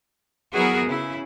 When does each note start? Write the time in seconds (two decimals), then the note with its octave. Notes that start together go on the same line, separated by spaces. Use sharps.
0.53 F#3 B3 E4 F#4 G#4 A#4
0.84 C#3 E4